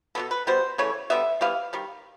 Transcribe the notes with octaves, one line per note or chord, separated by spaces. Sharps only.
B2 G#3 B3 A4
B4
B2 G3 B3 C5
C#3 E3 A3 C#5
D3 G3 B3 E5
E3 G3 B3 F5
D#3 G3